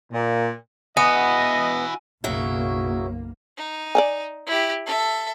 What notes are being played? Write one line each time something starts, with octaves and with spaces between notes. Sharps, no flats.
A#2
B3 E4 F#4 D#5 G#5 D#7
F#1 B1 C#3 F#3 A#3 E4
D#4
D5 D#5 G#5
E4 G4
A4 E5